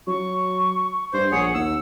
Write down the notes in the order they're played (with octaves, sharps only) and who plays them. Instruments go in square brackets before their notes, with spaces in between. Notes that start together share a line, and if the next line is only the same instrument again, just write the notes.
[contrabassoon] F#3 [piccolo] C#6
[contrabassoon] G2 [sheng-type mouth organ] C5
[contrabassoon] A#1 [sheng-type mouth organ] G#4 C#5 [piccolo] F#5
[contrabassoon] D#2 [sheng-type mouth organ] E6